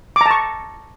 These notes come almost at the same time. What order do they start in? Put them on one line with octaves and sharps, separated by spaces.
D6 A#5 A5 C#6